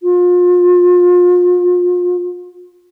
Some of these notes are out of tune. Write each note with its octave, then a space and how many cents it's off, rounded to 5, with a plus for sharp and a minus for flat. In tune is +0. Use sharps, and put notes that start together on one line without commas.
F4 +35